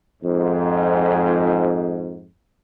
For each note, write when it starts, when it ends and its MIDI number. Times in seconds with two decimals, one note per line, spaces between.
0.23 2.25 41
0.23 2.25 44